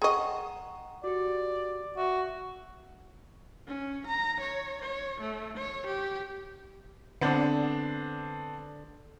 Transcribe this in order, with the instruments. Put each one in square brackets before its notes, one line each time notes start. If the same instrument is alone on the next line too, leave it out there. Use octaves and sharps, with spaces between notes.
[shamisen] G#4 D#5 [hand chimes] F#5 A#5 [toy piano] G5 C6 C#6
[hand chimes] F#4 G4 [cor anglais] D5
[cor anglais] F#4 [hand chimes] E5
[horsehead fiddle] C#4
A#5
C#5
C#5
A3
C#5
G4
[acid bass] D3 [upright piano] B3 C4 D4